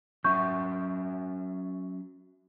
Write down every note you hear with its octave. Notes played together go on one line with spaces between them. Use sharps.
F#3 C#4 E5 C#6 G6